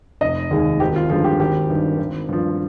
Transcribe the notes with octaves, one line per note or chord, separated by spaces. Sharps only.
F1 D#5
D#2 D#3 G#3
G#1 G4
F4
G2 D3 F3 G#3 F4
G4
G#1 G4
G2 D#3
G#1
G2 F3